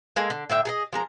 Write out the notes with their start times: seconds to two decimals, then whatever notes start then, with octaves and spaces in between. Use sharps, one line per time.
0.16 G#3 A#3 G#4 A4
0.30 D3
0.50 A2 D3 E5 G5
0.65 G#4 A4 D#5
0.93 F3 G#3 A#4